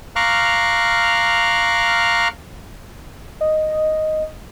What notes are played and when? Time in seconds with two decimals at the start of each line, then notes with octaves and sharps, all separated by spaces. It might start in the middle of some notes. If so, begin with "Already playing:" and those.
0.16 F5 A#5 C#6 D6 F6 F#6
3.41 D#5